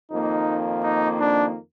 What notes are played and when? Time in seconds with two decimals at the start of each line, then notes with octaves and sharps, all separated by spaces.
0.11 F2 D#3 A#3 D#4
0.83 D#4
1.20 D4